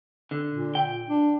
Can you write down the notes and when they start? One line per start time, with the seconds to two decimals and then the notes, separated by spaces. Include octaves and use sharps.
0.31 D3
0.54 A#2
0.75 G5
1.09 D4